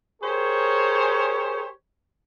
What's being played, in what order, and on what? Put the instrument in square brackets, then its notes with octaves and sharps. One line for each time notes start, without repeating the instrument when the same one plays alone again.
[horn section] G4 G#4 A#4 C5 C#5